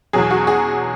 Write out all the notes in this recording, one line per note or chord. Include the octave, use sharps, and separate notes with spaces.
E2 B2 F#3 G#4
F#4
G#4